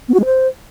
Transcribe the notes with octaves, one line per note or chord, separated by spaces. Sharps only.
B3
F#4
G#3
C5